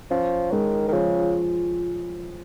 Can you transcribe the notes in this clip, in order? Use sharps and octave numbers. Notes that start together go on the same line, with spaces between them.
F3 C#4
D#3 G#3
D#3
C#3 F3